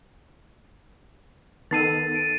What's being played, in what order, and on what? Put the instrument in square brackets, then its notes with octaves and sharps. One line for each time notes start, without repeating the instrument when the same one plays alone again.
[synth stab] D#3 B3 A4 [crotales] A6 C7 D#7
[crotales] D7